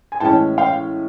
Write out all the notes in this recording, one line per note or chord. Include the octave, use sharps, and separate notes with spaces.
G#5
A2 E3 G#3 C#4 G5 A5
F5 G5